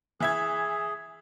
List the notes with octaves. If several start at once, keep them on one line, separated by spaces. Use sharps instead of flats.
E3 G#4 E5 G#6